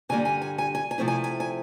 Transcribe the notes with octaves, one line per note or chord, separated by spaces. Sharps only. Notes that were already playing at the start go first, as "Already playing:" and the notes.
G2 D3 G3 A#3 G#5
G#5
G#5
G#5
G#5
G#5
C3 F3 A3 C4 E4
G#5
G#5
G#5